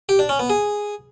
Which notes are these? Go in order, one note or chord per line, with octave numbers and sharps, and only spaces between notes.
G4
D4
C#4
B3
G#4